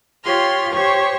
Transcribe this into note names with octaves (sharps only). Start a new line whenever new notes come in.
F4 G4 C#5 C6 F6
G4 C5 C#5 C#6